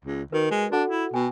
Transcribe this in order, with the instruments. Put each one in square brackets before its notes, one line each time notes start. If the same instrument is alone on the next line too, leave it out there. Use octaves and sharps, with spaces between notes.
[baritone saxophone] C#2
[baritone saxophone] D#3 [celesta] F#4 A#4 B4
[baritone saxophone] G#3
[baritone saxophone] D4 [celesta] F#4 A4 F#5
[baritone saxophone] E4
[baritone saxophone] B2 [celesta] G5 G#5